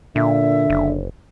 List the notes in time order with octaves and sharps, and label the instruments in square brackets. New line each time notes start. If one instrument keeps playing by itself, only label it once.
[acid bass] A#2 [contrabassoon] D3 [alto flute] E5
[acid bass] F#1